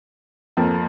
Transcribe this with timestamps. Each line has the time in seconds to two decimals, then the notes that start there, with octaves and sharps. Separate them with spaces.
0.57 F2 F3 A#3